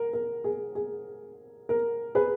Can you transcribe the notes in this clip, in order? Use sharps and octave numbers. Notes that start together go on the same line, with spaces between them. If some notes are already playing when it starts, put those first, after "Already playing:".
Already playing: A#4
A#4
G#4
G#4
A#4
G#4 B4